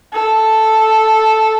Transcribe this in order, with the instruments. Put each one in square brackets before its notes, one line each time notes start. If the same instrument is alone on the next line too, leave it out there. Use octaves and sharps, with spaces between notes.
[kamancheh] A4